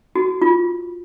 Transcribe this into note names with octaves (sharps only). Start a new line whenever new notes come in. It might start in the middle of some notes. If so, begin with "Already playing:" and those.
F#4
F4